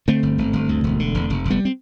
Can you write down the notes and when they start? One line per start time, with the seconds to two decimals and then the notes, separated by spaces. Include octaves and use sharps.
0.08 D3 A3 C4
0.23 G1
0.38 G1
0.53 G1
0.69 D2
0.84 E1
1.00 D3
1.15 E1
1.30 F1
1.45 F1
1.50 G3 B3
1.65 C4